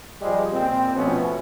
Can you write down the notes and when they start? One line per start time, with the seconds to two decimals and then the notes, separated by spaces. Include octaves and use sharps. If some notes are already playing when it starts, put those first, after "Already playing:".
0.22 F3 G3 G#3
0.53 A#2 C4
0.96 B2 F3 A3 B3 C#4